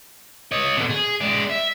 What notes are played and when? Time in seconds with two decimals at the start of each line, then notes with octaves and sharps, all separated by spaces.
0.52 C#5 D#5
0.76 B2 D3
0.89 G#4
1.21 G#3 D5
1.49 E5